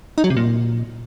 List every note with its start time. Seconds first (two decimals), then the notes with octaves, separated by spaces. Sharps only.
0.18 D#4
0.24 F#3
0.30 C3
0.37 A#2